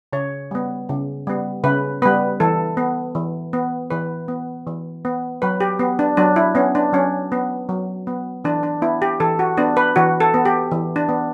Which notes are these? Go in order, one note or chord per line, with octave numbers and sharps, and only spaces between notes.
C#3 C#5
G3 B3
C#3
G3 B3
C#3 B4
G3 B3 B4
E3 A4
B3
E3
B3
E3 B4
B3
E3
B3
F#3 B4
G4
B3
D4
F#3 D4
E4
B3 C#4
D4
F#3 C#4
B3
F#3
B3
E3 D4
D4
B3 E4
G4
E3 A4
F#4
B3 D4
B4
E3 F#4
A4
B3
G4
E3
D4
B3